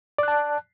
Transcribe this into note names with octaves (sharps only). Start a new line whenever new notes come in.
D5 A5 F#6